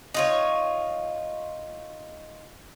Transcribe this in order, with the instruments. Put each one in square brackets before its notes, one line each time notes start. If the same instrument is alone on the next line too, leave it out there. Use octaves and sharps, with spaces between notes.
[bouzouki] D#4 F4 C#5